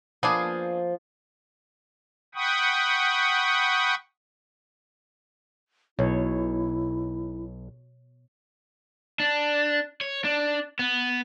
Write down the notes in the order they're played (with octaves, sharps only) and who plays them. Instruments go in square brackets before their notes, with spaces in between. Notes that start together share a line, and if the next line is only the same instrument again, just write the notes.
[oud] F3 A#3 [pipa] B3 D4 G#4
[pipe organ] F#5 G5 B5 C#6 D#6
[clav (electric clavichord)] B1 [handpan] B2 C#5 [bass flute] E4
[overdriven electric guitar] D4
C#5
D4
B3